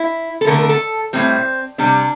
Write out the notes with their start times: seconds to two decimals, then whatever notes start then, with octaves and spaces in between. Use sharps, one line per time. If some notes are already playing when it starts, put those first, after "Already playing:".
Already playing: E4
0.41 A4
0.47 D3 A3 A#4
0.58 A#4
0.69 A4
1.13 A2 G3 C4
1.78 C3 G3 D4